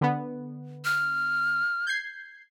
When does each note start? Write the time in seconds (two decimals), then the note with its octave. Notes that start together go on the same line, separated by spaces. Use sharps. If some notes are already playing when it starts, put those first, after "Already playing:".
0.01 D3 B3
0.85 F6
1.86 G6 G#6 C7